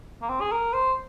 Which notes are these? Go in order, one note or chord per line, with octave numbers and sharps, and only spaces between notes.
A#3
C4
G#4
A#4
C5